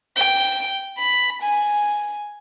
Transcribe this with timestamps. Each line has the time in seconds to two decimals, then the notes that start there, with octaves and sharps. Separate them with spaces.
0.16 G5
0.98 B5
1.42 G#5